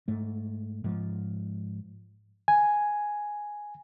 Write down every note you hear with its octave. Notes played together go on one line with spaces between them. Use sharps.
G#2 A3
G#2 F3
G#5